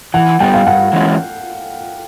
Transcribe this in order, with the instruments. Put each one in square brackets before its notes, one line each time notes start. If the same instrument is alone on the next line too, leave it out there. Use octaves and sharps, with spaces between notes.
[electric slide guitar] E3 [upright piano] F#5
[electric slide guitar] G3 B3 [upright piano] G5
[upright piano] F5
[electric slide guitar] G2 [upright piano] F#5
[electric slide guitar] E3 G#3 C#4